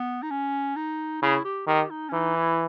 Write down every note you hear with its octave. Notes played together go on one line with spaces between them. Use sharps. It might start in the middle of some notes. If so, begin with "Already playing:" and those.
Already playing: B3
D#4
C#4
D#4
C#3 E4
G4
D#3 G4
D#4
C#4
E3 D#4
E4